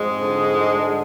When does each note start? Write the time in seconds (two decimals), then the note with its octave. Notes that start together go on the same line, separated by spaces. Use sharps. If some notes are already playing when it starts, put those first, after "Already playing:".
Already playing: F2 G#2 G#3
0.21 D3
0.56 D3